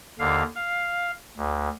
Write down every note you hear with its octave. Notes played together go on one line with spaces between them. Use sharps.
D#2 D3 F5
F5
D2